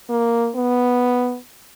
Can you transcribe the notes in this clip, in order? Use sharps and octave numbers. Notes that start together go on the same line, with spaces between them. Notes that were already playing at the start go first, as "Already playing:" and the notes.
A#3
B3